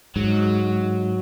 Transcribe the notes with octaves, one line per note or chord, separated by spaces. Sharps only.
G#2 F#3